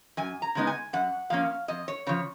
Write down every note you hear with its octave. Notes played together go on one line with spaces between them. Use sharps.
F#2 G#5
A#5
C#3 G#3 B3 D#4
G#5
F#2 F#5
F3 A#3 C#4 F5
F2 D#5
C#5
C#3 F3 C#5